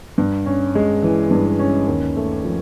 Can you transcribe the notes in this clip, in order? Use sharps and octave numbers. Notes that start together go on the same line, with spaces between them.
G2
C#4
G#3
E3
G2
C#4
D#2
A3
F3